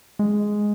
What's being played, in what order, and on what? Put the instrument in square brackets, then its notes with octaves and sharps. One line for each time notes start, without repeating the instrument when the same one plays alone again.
[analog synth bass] G#3